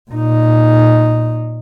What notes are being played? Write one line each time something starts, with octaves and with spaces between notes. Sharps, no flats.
A#2 D#4